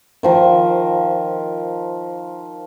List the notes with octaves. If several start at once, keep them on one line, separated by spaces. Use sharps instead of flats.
D#3 F3 A#4